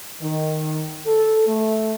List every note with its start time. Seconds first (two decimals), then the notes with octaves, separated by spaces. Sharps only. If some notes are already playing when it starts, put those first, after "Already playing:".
0.21 D#3
1.06 A4
1.46 A3